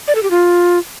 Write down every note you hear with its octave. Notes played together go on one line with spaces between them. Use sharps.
D5
A4
G4
F4